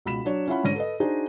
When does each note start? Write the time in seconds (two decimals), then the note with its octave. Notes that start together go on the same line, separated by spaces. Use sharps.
0.05 C#2 B2 B5 B6 E7
0.25 F#3 D4 C#5
0.48 C#4 E4 F4 E5 F#5 B5
0.64 G#2 D3 C#5 A#6 D#7
0.76 A4 B4 D#5
1.00 D4 D#4 F#4 G#4 C5